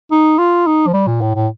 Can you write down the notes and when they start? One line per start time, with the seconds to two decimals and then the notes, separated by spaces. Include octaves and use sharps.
0.11 D#4
0.38 F4
0.67 D#4
0.87 F3
0.94 G3
1.07 A#2
1.21 A2
1.35 A2